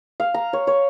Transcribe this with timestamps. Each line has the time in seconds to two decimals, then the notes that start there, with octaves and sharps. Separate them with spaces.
0.20 F5
0.34 A#5
0.53 C#5
0.67 C#5